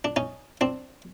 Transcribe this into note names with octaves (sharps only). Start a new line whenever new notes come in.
D4
C#4 D#4
C4 D4